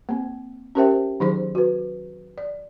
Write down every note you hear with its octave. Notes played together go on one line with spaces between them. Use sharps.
A#3 C4
C#4 G4 A#4 C5 E5 G5
D#3 F#3 D#4 G#4 C5
F#4 B4
D5